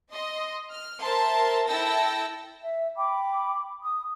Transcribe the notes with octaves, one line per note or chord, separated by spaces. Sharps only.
D#5 C6
F6
A#4 C5 E5 A5 C6
E4 A4 G5 A5 E6 A#6
E5
G5 B5 D6
D#6